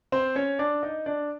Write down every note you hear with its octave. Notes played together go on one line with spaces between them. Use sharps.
C4 C5
C#4 C#5
D4 D5
D#4 D#5
D4 D5